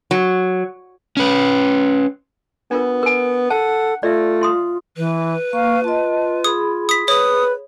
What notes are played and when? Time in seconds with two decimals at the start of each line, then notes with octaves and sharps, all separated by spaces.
0.11 F#3
1.17 C#4 B4
2.71 B3 D4 F4 A#4
3.03 A#4 G#5
3.50 A4 F#5 A5
4.03 A3 F4 D5 E5
4.41 E4 C6 D#6
4.97 E3 B4
5.53 A#3 F5 C#6
5.84 F4 D#5 A5
6.44 G#4 B5 D#6
6.89 D#6 B6
7.08 B4 C#5 D#6